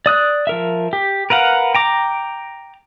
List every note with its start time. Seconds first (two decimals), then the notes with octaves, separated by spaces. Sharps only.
0.06 D5 D#6 F#6
0.47 F3 A#4 E5
0.93 G4
1.30 A#4 B4 F5 F#5
1.75 G5 A#5 D6